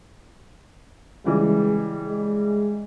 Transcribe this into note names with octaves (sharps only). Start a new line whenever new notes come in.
C#3 E3 G3 G#3
G#3